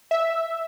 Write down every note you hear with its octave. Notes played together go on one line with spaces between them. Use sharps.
E5